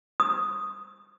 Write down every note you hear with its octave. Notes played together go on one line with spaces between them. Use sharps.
D#6